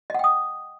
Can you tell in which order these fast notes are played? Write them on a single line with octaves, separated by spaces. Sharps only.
D#5 F#5 G5 D#6